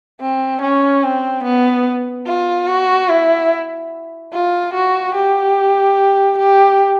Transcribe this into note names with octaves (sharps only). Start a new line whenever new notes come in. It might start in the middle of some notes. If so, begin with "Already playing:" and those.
C4
C#4
C4
B3
F4
F#4
E4
F4
F#4
G4
G4